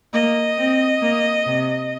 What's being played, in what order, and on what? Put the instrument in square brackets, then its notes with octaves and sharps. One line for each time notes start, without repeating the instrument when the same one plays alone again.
[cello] A#3 [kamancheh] D#5
[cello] C4
A#3
C3